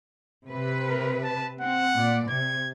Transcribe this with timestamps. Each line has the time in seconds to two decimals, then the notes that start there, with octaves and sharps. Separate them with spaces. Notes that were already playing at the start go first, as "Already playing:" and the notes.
0.49 C3 B4
0.87 A#4
1.24 A5
1.61 C4 F#5
1.95 A#2 D5
2.29 C3 G#6